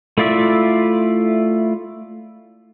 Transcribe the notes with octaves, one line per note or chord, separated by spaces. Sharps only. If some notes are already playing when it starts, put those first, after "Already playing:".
A3 E4 F4 D5 E5